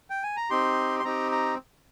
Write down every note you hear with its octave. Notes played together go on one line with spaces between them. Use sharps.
G5
G#5
A#5
C4 D#4 G4 C6
C6
C4 D#4 G4 A#5
A#5